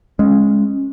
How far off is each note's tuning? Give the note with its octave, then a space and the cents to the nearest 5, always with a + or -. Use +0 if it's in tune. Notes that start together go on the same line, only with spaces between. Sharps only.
G#3 +0 C#4 -15